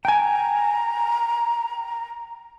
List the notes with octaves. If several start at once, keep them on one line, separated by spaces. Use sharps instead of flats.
G5 G#5 A#5